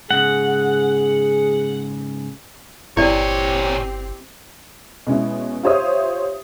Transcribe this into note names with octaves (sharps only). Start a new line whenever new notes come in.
G#2 C#3 G#4 F#5
G1 A#2 C4 E4 G4 C#5 D5
B2 G#3 C#4 E4
F4 G4 C5 C#5 E5 D#6